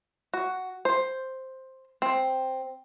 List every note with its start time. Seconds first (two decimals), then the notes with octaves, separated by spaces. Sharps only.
0.34 F#4
0.85 C5
2.02 C4